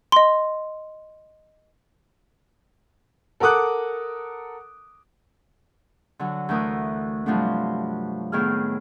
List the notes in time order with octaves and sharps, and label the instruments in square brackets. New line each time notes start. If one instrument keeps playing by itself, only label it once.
[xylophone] D#5 C6
[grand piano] A4 A#4 F#5 D6 D#6 F#6
[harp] D3 F#3
D2 E3 A3 A#4 D#6
G2 C3 F3 F#3 A3 D4
A2 D#3 B3 G#4 F6